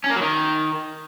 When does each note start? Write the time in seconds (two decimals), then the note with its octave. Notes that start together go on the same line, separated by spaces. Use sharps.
0.04 C#4
0.10 A#3
0.16 F#3
0.22 D#3